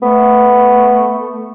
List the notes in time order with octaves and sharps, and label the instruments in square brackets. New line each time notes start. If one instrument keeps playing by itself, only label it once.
[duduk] A3 [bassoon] B3